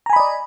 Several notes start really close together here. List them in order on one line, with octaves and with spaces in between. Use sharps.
A#5 G#5 B5 D#5 D5